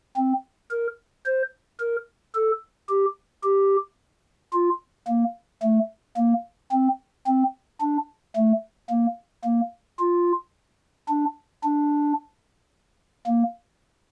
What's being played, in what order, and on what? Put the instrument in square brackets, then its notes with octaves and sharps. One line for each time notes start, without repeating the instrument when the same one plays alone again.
[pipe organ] C4
A#4
C5
A#4
A4
G4
G4
F4
A#3
A3
A#3
C4
C4
D4
A3
A#3
A#3
F4
D4
D4
A#3